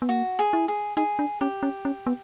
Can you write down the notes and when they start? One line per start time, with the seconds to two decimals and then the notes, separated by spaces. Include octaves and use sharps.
0.02 B3
0.09 A#3 F#4
0.39 G#4
0.53 E4
0.68 G#4
0.97 D#4 G#4
1.19 D4
1.41 C#4 G4
1.63 C#4
1.85 C#4
2.06 B3